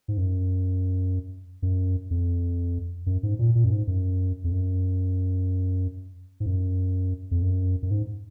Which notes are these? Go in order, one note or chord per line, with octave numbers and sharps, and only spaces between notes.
G#2
F#2
F#2
F2
F#2
G#2
A#2
A#2
F#2
G#2
F#2
F2
F#2
G#2
F#2
F2
F#2
F#2
G#2